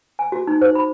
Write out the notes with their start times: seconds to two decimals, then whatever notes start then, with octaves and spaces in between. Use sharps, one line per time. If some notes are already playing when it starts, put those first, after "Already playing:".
0.19 G#5
0.32 F#4
0.47 D#4
0.61 C5
0.75 B5